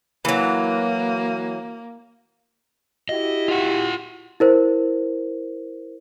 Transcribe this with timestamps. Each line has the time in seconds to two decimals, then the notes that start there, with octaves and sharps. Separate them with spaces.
0.25 E3 F#3 A#3
3.09 E4 F#4 G4 D#5
3.48 F4 F#5
4.40 E4 A#4 C5